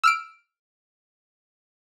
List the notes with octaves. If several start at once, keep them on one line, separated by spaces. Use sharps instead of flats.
E6 F6 D7